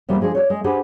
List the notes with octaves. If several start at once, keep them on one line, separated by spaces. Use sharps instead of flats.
E2 C3 G3 A#3
F3 G#3 D4 G#4
C#5 D5
G#3
D4 G4 G#4 B4 C5 F#5